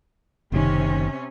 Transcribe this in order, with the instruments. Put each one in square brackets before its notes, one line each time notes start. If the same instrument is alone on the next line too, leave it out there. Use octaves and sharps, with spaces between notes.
[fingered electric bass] F#1 D#3 [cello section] C3 C#4